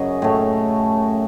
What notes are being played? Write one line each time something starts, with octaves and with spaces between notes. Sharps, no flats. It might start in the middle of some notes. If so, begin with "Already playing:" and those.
Already playing: F#2 C#3 F#3 D#5
A2 A3